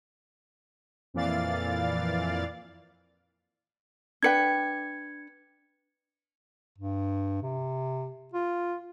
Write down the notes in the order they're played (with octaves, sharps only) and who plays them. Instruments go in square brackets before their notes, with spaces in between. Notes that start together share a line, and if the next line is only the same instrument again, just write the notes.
[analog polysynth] F2 A#2 E3 D5 F5 A6
[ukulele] D4 B4 G5 [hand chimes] G#6 C#7
[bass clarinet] G2
C3
F4